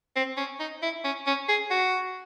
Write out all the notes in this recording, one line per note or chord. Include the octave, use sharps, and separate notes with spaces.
C4
C#4
D#4
E4
C#4
C#4
G#4
F#4